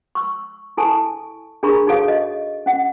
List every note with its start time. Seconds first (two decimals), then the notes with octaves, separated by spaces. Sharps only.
0.15 C#6 E6
0.77 E4 A4 G#5 A5 C#6
1.63 D4 G#4 A#4 A#5 B5 C#6
1.87 D#4 F#4 G#4 A4 C#5 F5
2.08 D#5
2.66 C#4 F#5